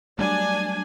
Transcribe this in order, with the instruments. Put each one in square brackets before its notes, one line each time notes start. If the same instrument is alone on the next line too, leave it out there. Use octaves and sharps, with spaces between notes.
[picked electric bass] F#3 G3 A3 [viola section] D4 G#5